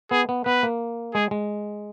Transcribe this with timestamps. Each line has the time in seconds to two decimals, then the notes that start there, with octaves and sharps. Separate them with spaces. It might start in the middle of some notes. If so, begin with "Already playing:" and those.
0.11 B3 G#4
0.29 B3
0.46 B3 B4
0.63 A#3
1.14 G#3 G#4
1.31 G#3